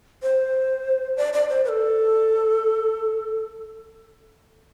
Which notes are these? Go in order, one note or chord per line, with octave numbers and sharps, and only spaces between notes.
C5
D5
D5
C5
B4
A4